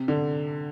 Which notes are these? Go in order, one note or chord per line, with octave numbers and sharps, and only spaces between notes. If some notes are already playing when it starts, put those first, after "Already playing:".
Already playing: C3
D3